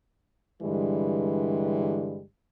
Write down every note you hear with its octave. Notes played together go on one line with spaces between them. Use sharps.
G2 D3 E3 G3 G#3